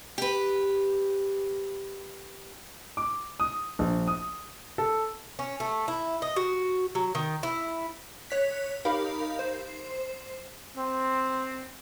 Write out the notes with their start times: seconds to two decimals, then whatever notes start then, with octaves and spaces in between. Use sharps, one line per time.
0.18 G4 B4
2.97 D6
3.40 D#6
3.79 A#1
4.08 D#6
4.78 A4
5.39 C#4
5.60 A3
5.88 E4
6.22 D#5
6.36 F#4
6.95 F#3
7.15 D#3
7.43 E4
8.30 C#5 F#6 B6
8.85 D#4 G4 A#4 F5 B5
9.39 C5
10.76 C4